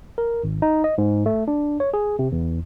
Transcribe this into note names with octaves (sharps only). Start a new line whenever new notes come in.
A#4
G#1
D#4
D#5
G#2
A3
D4
C#5
G#4
C3
E2